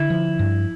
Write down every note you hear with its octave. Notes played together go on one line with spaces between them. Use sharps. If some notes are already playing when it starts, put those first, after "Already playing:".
Already playing: D3 E4
F3
G2